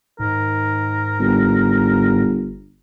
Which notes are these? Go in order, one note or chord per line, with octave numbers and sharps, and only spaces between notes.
G#2 D#3 A#4
G1